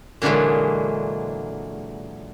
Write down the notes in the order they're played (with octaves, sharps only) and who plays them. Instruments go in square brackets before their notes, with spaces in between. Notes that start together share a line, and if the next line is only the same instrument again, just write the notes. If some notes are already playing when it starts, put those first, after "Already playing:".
[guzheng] A#2 D3 E3 F#3 G#3